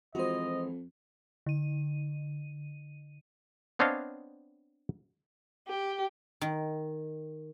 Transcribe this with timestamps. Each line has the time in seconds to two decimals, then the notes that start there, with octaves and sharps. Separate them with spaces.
0.15 F2 E3 G#3 F4 F#4 C5 D#5
1.46 D3 D#7
3.79 B3 C4 D4 C#5 D#5 F5
5.68 G4
6.41 D#3